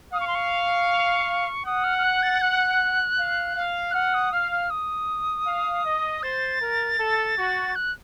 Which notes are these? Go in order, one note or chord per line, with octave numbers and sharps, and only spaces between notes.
F5 D#6
C#6
C6
C#6
F#5 D#6
F6
F6
F#6
A6
F#6
F5
F5
F#6
F#5 F6
D#6
F5 F6
F6
D#6
F5
D#5
C5 A6
A#4
A4
F#4
F#6